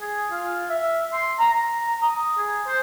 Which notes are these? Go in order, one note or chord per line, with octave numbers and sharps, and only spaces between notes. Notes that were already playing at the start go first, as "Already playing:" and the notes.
G#4
F4
E5
C6
A#5
D#6
G#4
C5